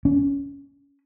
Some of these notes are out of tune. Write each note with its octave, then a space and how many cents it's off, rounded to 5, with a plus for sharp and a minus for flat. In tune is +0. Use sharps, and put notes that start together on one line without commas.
C#4 +20